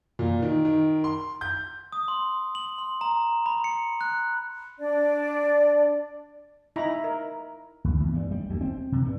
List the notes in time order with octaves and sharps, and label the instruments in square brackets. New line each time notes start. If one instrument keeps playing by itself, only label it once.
[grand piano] A#2
D#3
D#3
C6
G6
[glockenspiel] D#6
C6
F#7
C6
A#5
B5
C#7
F#6
[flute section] D4 D5
[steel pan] D#4 E4 D#5 A#5 B5
A#4
[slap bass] D2
E2
G2
G3
D2
C4
C3
G2